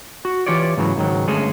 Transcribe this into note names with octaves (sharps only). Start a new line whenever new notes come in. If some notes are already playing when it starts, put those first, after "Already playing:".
F#4
E3 F4 G4 C#5 D5
G#2 C#3 E3 F#3
C#2 G#2 D#3 F#3
D2 G2 G#3 C#4 G#4 A4